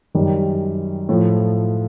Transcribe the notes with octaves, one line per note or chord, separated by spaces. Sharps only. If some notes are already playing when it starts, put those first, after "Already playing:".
F#2 D#3 G3
A2 F3 A3